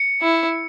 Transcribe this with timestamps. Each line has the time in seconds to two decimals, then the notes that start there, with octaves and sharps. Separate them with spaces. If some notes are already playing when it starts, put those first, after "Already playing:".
Already playing: C#7
0.22 E4